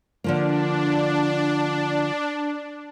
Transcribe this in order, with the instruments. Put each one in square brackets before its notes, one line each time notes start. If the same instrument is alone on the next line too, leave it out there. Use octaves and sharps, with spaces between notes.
[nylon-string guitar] D3 F3 A#3 [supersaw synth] D4